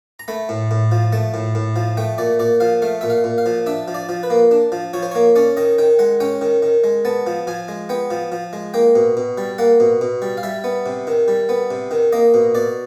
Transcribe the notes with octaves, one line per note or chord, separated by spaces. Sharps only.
A#5
A3 B5
A2
A2
F3
A3 A5
A2
A2
F3
A3 G5
A#2 D5
A#2 D5
F3 F5
A3 F5
A#2 E5
F5
A#2
F5
F3
D4 E5
F3
D5
F3
B4
A#3
D4
F3
F3 C#5
C5
A#3 C#5
C#4 D5
D#3 D#5
D#3 G5
G#3 F#5
C#4 G5
D#3
D#3
G#3
B3 A5
F3
F3 G#5
G#3
B3 G5
F3
F3
G#3
A#3 G5
B2
B2
G3
A#3 F#5
B2
B2
G3
F5
G3 E5
B3
C3
D#3
G3
B3
C3
D#3
A#3 D#5
B2
B2 D5